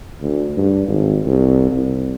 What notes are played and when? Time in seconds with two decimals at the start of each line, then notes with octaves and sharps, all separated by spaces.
0.21 D2
0.57 G2
0.88 G#1
1.26 C2
1.71 C2